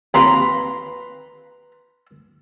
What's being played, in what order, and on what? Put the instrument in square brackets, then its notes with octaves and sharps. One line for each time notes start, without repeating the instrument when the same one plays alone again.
[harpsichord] D#2 C4 F4 [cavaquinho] B4 A#5 C6